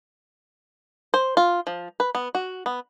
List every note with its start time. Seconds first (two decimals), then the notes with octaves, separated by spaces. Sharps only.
1.14 C5
1.37 F4
1.67 F3
2.00 B4
2.15 B3
2.35 F#4
2.66 B3